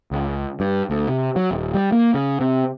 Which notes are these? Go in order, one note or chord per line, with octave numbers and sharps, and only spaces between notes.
C#2
G2
D2
C3
F#3
D#1
G3
A#3
C#3
C3